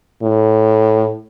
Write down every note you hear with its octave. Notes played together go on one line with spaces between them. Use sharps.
A2